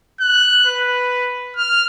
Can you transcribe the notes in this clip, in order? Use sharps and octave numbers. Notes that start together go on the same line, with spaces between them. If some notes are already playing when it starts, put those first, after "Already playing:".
F#6
B4
F6